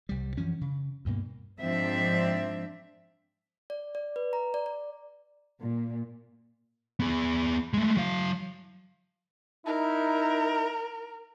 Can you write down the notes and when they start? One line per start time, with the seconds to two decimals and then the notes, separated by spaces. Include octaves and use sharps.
0.09 C2 G3
0.37 F#2 E3 F3 C#4
0.61 C#3
1.05 D2 G2 B2 A#3
1.60 G#2 F3 C4 D4 E5
3.70 D5
3.95 D5
4.16 B4
4.33 A#5
4.54 D5
4.66 D5
5.61 A#2
7.00 B3 G#4
7.74 G#3 A3
7.97 F#3 F5
9.66 D#4 E4 A#4